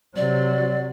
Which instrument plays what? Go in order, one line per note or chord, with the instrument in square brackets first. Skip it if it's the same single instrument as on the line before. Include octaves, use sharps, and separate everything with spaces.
[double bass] C3 F#3 [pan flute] D5